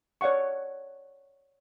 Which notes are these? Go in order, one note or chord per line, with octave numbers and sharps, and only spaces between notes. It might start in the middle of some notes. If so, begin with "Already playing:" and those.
C#5 D5 F5 F#5 C#6